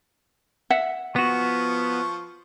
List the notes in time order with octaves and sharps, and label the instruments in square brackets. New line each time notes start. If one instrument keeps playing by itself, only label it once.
[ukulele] E5 F#5
[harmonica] F3 C#6 [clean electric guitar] B3 F#4